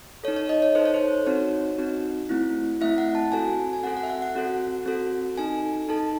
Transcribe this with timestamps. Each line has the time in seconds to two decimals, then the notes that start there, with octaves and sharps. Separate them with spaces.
0.24 A4 C#5
0.28 D#4
0.36 C#5
0.49 D#5
0.62 C#5
0.75 D#4 A4 C5
0.85 C#5
0.94 C5
1.26 C4 D#4 F#4 C#5
1.78 C4 D#4 F#4
2.29 A3 C4 E4
2.81 A3 C4 E4 E5
2.98 F#5
3.15 A5
3.32 C4 F#4 A4 G#5
3.73 G#5
3.83 C4 F#4 A4 F#5
3.97 F#5
4.03 E5
4.09 F#5
4.22 F#5
4.35 C4 F#4 A4
4.86 C4 F#4 A4
5.38 D#4 A4 G#5
5.89 D#4 A4 A5